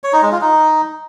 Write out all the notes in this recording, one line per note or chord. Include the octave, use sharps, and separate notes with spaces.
C#5
D#4
G#3
F4
D#4